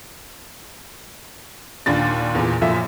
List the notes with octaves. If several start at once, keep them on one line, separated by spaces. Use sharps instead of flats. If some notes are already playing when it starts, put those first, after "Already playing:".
D#2 A#2 D4 C6 A6
E2 A#2
F#2 A#2 F3 E5